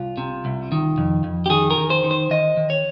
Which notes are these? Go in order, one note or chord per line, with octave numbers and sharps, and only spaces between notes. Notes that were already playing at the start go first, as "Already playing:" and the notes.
Already playing: C2 F4
C3
C2
D#3
F2
F2
G4
D#3 G#4
A#4
D#3
C5
D#3
C5
D#3 D#5
D#3
C#5